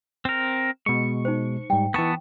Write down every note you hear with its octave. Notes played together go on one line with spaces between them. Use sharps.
C4 A#4
B2 G#3 C#6
D#4 C5
G#2 G3 G5
E3 B3 A5 C#6